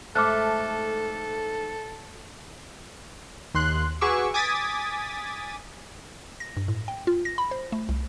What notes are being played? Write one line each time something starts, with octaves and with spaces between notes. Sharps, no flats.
G#2 A3 A4 D6 F6 F#6
D#2 C6 F#6
F#4 G#4 B4 C#6 D6 E6
G#5 D6 D#6 G#6 A6 B6
A#6
G2
A2
G5
F4
A#6
B5
C5
A3
C2